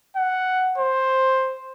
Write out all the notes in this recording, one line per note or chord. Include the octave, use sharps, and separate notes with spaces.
F#5
C5